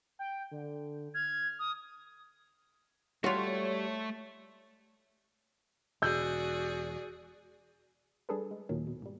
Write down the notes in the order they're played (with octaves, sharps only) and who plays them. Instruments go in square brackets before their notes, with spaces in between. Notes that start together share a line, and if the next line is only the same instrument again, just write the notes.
[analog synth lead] G5
D3
[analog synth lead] F6 [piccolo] G#6
[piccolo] D#6
[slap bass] G3 [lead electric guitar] A3 A4 [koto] F4 F#4 [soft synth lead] C#5
[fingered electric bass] E1 [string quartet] F#4 G#4 D5 [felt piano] E6 G6
[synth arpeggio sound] G3 D4 G#4 A4 B4
G#3
D#2 A#2 D#3 F#3
B2
G#2 G3